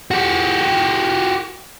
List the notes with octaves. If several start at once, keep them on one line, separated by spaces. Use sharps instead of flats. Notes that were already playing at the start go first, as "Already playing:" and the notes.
F#4 G4